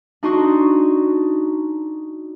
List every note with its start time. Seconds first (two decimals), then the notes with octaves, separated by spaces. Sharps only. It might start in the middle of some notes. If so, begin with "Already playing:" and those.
0.23 D4 D#4 F#4 D#5 C6 C#6